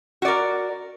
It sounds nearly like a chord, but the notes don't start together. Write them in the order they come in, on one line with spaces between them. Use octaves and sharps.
F#4 D5 A#4